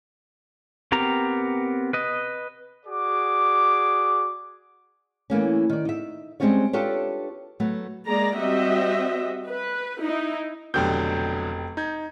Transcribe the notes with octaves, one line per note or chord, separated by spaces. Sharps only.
B3 C4 G4 A#4 A#5
B4 D#5
F#4 G#4 D5 D6
E3 A3 A#3 C#4
D#3 D5
D#4 E5
G3 G#3 C4 C#4 F4 C#5
D4 F4 G4 A4 B4 C#5
F#3 A3 B3
G#3 A#3 G#4 D5 A#5
G3 C4 F#4 D#5 E5
B4
D#4 E4
F1 B2 D3 F#3 G4 G6
D#4 G6 G#6